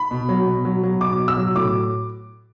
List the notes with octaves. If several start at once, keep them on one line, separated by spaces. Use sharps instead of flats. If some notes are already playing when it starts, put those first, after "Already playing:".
Already playing: B5
B2
F#3
B2
F#3
F#3
B2 D6
B2
E6
F#3
A2 D6